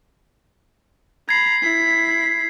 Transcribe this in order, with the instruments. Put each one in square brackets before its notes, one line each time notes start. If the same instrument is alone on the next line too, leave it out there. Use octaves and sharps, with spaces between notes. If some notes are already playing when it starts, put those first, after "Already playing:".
[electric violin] A#5 B5 [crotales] G#6 C7
[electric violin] E4 B6